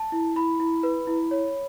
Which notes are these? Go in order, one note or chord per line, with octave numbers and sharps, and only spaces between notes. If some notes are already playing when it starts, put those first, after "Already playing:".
Already playing: A5
E4
E4 B5
E4
B4
E4
C#5